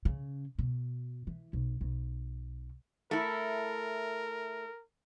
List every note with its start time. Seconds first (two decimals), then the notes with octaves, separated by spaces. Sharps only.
0.05 C#3
0.59 B2
1.27 E3
1.53 B1
1.81 B1
3.11 A3 E4 A#4